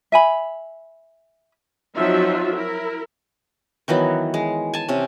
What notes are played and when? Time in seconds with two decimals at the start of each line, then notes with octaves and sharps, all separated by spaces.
0.12 E5 G#5 B5
1.96 F3 F#3 C4 D#4 F4 E5
2.55 E4 A#4
3.88 D#3 E3 F#3 B3
4.34 G#3
4.74 G#5 A5
4.88 C3 C#4